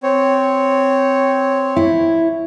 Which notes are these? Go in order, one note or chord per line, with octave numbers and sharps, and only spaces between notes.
C4 C#5
E4